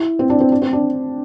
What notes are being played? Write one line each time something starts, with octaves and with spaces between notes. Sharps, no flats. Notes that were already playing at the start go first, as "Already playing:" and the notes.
Already playing: E4
C4
D4
C4
D4
C4
D4